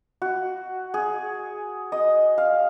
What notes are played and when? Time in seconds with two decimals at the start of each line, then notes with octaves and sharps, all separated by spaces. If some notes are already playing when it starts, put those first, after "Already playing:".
0.22 F#4
0.94 G#4
1.92 D#5
2.38 F5